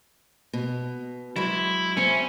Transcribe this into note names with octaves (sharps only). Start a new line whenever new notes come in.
B2
F#3 G#3 E4
C4 C#4 E5